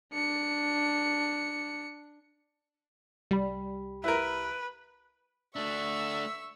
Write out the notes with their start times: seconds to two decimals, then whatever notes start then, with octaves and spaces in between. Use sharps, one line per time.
0.13 D4 C#7
3.31 C2 G3 G4 B5
4.04 E4 A#4 B4
5.56 A3 D4 E5 C#6 E6